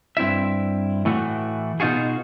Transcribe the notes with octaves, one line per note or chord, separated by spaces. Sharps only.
G2 C4 E4 E5
A2 E3 A3 F#4
B2 D#4 F4 F#4 G#4